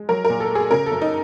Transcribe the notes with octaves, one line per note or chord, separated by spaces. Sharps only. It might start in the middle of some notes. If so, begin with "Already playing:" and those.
Already playing: G#3
F#3 A#4
A#4
A#2
A4
A3
G#4
C#3 A#4
F#2 A4
D#4